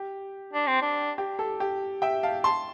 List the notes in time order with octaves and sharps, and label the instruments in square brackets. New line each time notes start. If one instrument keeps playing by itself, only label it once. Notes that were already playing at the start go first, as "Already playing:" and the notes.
Already playing: [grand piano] G4
[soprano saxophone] D4
C4
D4
[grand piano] G4
A4
G4
E5 G5
F5 A5
A5 C6